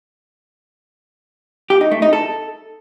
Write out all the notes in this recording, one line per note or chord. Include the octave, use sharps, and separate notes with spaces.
G4
D#4
A3
D#4
A4